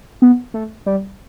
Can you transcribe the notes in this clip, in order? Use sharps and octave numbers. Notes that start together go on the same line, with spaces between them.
B3
A3
G3